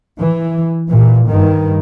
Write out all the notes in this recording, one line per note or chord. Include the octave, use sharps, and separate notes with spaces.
E3
A#2 E3
G2 D#3